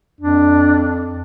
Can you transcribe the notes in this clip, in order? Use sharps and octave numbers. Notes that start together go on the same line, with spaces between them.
F2 D4